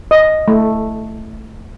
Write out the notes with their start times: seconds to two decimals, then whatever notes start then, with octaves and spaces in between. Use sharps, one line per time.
0.11 D#5
0.48 A3